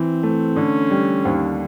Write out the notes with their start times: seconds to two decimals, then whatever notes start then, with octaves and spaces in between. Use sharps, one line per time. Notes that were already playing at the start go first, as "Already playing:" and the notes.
Already playing: E3 C4
0.23 A3
0.56 D3 C#4
0.91 G3
1.25 D#2